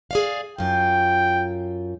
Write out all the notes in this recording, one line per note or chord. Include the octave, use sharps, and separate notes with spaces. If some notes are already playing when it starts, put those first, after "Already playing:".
G#4 D5 F5
F#2 F4 G5